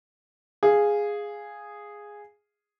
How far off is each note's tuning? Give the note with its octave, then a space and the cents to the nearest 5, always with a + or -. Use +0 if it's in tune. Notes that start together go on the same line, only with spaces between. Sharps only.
G#4 -5 F5 +0